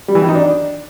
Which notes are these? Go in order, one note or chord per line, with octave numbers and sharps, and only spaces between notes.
G3
E3
D#3
D#4
D4